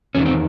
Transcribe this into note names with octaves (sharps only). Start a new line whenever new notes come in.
E2 D#3 C#4
C4